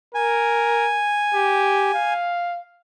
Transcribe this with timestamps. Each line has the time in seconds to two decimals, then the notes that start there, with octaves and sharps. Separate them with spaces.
0.15 A#4 G#5
1.34 G4
1.94 F5